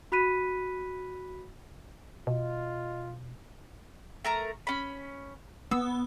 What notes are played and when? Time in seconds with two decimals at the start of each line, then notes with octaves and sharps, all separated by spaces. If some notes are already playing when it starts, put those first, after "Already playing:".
0.12 F#4 B5 F#6 B6 D#7
2.27 B2 F4 D#5
4.25 A3 A#4 A#5
4.67 C#4 B5
5.71 B3 E6